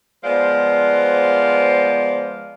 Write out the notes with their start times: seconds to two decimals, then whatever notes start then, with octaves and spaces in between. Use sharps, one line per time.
0.23 F3 G#3 B3 C5 D5 F5